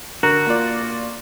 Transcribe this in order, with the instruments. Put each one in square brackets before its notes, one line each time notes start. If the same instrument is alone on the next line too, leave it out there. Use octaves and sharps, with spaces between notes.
[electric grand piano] D3 [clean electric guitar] F#4 [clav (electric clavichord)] A#4
[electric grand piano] A#3 F4 D5